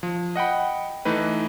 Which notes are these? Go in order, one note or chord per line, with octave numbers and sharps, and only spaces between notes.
F3
D#5 F#5 G5 B5
E3 A3 D#4 B4